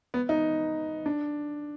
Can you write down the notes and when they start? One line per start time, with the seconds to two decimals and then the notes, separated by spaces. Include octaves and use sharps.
0.14 B3
0.29 D#4
1.06 D4